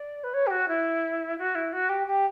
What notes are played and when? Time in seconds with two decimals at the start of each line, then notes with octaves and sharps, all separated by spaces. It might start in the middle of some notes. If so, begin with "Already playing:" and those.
Already playing: D5
0.23 B4
0.34 C#5
0.47 G4
0.50 F#4
0.68 E4
1.38 F#4
1.55 E4
1.73 F#4
1.89 G4
2.07 G4